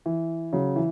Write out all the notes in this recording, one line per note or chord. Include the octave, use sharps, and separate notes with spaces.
E3
C#3 F#3
E3